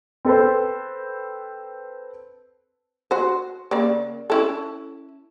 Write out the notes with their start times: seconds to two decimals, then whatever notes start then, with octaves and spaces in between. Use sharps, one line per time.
0.25 C4 A4 B4 C5
3.11 F#4 C5
3.71 C#3 A#3 D5
4.30 C#4 E4 A4